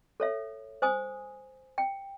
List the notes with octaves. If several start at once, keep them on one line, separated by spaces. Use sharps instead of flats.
A4 C#5 E5
C5 G#5 D#6
G5